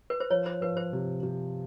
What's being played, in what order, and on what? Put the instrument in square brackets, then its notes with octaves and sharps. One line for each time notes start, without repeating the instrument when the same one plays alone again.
[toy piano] B4
C5
[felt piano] F3 [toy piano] C#5
[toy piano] C5
[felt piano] F3 [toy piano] B4
[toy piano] C5
[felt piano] C3
C3